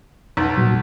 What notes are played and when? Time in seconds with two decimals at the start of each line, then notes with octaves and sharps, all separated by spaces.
0.37 B1
0.57 A#2 F#3